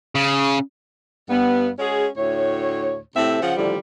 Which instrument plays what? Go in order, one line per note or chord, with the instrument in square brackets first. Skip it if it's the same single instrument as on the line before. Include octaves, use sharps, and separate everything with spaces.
[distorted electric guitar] C#3
[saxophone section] G2 B3
G#3 C#4 F#4 G#4
D2 A2 C#5
A2 C3 C4 A4 E5
C#3 F3 F#5
A2 D3 D#3 F3 G3